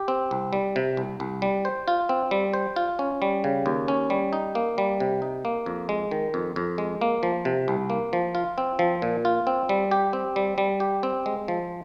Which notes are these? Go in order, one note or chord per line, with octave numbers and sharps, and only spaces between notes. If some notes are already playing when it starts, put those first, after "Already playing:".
Already playing: G4
C4
C2
G3
C3
C2
C2
G3
C5
F4
C4
G3
C5
F4
C#4
G3
C#3
D#2
C#4
G3
D#4
A#3
G3
C3
D#4
A#3
F2
G#3
D#3
F2
F2
G#3
A#3
F3
C3
C2
A#3
F3
F4
C4
F3
A#2
F4
C4
G3
G4
C4
G3
G3
G4
C4
G#3
F3